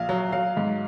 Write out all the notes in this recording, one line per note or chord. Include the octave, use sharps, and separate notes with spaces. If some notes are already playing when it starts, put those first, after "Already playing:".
Already playing: A#1 F5
F#3
F#3 F5
G#2